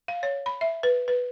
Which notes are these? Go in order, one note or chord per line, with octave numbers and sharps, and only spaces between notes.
F5
C#5
B5
E5
B4
B4